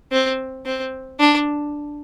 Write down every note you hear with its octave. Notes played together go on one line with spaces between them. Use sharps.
C4
C4
D4